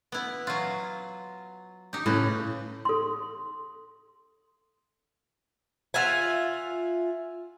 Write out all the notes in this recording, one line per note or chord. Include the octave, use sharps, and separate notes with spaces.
B3 E4
F#3 F4
D#4 G4
A2 C#3 B4
A4 C6
F4 E5 F#5 G#5